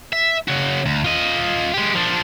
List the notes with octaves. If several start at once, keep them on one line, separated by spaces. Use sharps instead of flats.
E5
C#3 F#4
D2
F4 D#5
G#3 G4
F3 D4